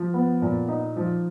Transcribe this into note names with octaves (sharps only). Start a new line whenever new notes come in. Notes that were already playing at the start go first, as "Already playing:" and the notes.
Already playing: F3
B3
A#2
D#4
F3